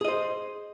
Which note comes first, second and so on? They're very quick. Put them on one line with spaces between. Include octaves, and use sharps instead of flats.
G#4 D#5 C5